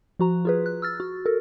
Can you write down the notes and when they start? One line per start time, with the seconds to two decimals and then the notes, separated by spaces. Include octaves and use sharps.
0.19 F3 F#4 A#5
0.45 F4 G#4 B4
0.66 F#6
0.82 E6 F6 A6
1.00 F#4
1.26 A4 A#4